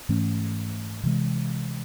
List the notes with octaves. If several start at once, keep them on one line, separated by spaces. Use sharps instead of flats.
G#2 E3 A3 C#4
C3 E3 G#3